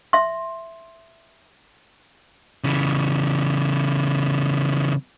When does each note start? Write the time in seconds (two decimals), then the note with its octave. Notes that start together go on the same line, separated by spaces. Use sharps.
0.13 E5 C6
2.64 C#3 E3